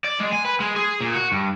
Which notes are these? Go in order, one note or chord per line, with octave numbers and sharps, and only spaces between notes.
D5
G#3
G#5
B4
G#3
G#4
A#2
F#4
G2